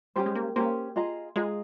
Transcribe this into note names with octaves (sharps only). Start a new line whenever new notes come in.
G3 C#4 G4 C5
G#3
A#3
A#3 C#4 G4 C5
F4 G#4 D#5 A#5
G#3 F4 G#4 D#5 A#5